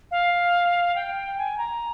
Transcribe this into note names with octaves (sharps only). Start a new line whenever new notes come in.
F5
G5
G#5
A#5